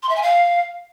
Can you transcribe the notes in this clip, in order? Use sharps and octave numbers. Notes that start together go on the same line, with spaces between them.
C6
E5
G#5
F5